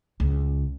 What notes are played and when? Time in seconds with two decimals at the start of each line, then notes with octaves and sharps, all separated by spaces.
0.20 C#2